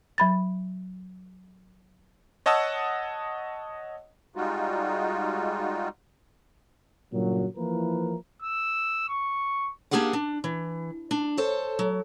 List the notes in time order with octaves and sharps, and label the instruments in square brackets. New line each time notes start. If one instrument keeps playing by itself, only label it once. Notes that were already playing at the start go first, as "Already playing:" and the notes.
[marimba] F#3 B5 A6
[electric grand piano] C#5 D#5 F#5 A5 D#6 E6
[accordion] G3 G#3 D#4 F4 F#4
[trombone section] G2 A#2 C#3 F#3
E3 F3 A#3 E4 A#4 B4
[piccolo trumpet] E6
C#6
[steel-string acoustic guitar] A#3 D4 G4 G#4 F5 F#5
D4
E3
D4
A4 C5 C#5
F#3